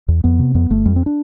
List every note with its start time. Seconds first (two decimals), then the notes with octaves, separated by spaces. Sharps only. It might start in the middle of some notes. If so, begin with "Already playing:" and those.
0.08 E2
0.24 F2 B3
0.39 C3
0.55 F2 B3
0.70 G1 A3
0.86 F2 G3
0.96 C4
1.06 D4